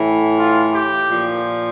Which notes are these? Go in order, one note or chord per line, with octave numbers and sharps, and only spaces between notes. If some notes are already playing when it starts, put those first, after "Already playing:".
Already playing: A2 E3
F4
G4
A#2 F3